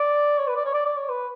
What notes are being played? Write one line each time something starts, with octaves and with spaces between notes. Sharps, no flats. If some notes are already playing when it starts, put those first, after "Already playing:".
Already playing: D5
C#5
B4
D5
C#5
D5
D5
C#5
B4